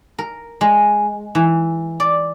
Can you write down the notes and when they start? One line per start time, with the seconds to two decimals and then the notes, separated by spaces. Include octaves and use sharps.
0.19 A#4
0.61 G#3
1.35 E3
2.00 D5